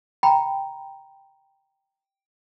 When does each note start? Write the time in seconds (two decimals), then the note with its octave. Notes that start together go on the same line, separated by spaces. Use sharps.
0.23 G5 A#5 B5